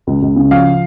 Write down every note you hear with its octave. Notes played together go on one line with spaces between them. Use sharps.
C#2
C#2
C#3
F3 F5